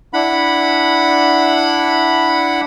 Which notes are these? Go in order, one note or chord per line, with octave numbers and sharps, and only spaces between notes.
D4 E4 F#5 B5